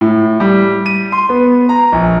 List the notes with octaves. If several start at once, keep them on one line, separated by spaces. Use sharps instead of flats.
A2
G3
D#7
C6
B3
A#5
A#1